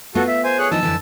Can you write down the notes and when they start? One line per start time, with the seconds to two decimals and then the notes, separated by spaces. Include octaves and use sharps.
0.15 A3 B3 F4 F#4 A4
0.28 E5
0.44 C5 G#5
0.58 G#4 C#5 F#6
0.71 E3 F3 D#4 A5 E6
0.83 F2 D3 E3